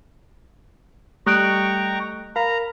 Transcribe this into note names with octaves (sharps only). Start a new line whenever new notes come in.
G3 A3 G5 A#5 C#6 F#6 D7
A#4 F5 A#5 B5